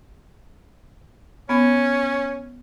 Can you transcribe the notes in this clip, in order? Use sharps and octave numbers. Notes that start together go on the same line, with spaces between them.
B3 C#4